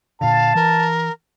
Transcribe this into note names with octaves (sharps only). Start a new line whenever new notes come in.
A#2 D3 F5 A5
E3 A#4